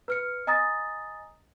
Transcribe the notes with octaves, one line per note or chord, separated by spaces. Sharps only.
B4 F6 C#7
D#5 G#5 A#5 D#6 A6 A#6